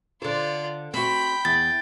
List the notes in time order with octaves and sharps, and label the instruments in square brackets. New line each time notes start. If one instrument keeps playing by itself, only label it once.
[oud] D3 C5 [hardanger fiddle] F4 D5
[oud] C4 F#4 [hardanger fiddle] G5 [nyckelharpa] B5
[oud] E2 [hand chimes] A6